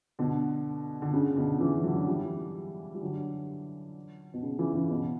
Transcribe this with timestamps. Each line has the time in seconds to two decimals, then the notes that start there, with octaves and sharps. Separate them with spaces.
0.19 B2 D3
1.02 D3
1.13 C#3
1.36 B2 D3
1.60 C#3 E3
1.84 D3 F#3
2.07 E3 G3
2.94 G3
3.02 D3 F#3
4.34 B2
4.43 C#3
4.59 C#3 E3
4.75 C#3
4.90 B2